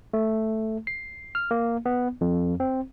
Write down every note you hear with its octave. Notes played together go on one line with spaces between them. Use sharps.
A3
C7
F6
A#3
B3
F2
C4